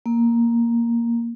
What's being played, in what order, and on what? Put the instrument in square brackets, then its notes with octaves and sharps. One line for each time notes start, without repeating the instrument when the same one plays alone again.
[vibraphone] A#3